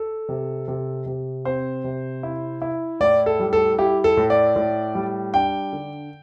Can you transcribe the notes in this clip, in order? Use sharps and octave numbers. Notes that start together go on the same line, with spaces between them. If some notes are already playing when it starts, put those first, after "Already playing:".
Already playing: A4
C3
C3
C3
C4 C5
C3
E4
E4
A2 D5
A4
G3
A4
E4 G4
A4
A2
D5
A2
G3
D4 G5
D3